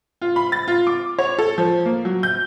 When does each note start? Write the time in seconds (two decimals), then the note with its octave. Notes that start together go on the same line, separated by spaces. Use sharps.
0.22 F4
0.36 B5
0.52 A6
0.68 F4
0.87 D6
1.18 C#5
1.39 A4
1.58 F3
1.85 A#3
2.05 F#3
2.23 G6